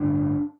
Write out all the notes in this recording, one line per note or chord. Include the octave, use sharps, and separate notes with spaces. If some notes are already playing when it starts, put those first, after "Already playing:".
Already playing: A1 G2 D3 D4